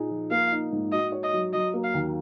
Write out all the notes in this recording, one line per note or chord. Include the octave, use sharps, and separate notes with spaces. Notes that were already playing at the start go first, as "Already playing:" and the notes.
Already playing: A#2 D#4 G#4
F3
A#3 F5
D#4
G#2
F#4 D#5
C#5
D#5
F#3
F#3 D#5
A#3
F5
D#2